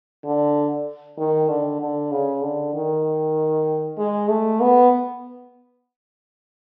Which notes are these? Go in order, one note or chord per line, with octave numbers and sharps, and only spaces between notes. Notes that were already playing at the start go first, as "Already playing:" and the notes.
D3
D#3
D3
D3
C#3
D3
D#3
G#3
A3
B3